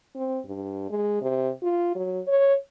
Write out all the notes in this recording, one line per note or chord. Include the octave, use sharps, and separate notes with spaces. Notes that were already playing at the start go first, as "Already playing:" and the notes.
C4
G2
G#3
C3
F4
F#3
C#5